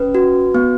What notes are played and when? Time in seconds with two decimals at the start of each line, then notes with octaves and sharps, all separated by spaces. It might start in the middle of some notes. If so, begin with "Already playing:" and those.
Already playing: C#4 B4
0.15 F#4
0.55 B3